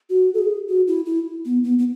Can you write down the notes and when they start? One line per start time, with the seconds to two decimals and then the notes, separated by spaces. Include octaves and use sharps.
0.10 F#4
0.34 A4
0.39 G#4
0.68 F#4
0.88 E4
1.06 E4
1.45 B3
1.64 B3
1.79 B3